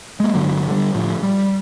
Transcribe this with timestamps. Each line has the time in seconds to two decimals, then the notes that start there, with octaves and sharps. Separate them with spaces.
0.20 G#3 A#3
0.34 G1 D2 D3 F#3
0.68 D3 G3
0.94 A2 F3
1.23 G3